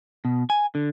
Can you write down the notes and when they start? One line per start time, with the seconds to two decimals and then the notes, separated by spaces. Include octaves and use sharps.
0.25 B2
0.50 G#5
0.75 D3